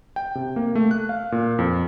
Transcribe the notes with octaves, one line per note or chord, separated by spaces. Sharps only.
G5
C3
A#3
A3
F#6
F5
A#2
F2